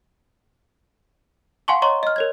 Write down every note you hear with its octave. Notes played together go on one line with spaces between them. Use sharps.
F5 F#5 G#5 A5 C6 C#6
C#5 D#5 A#5 C6 C#6
D#5 F6
A#4 C#5 G#6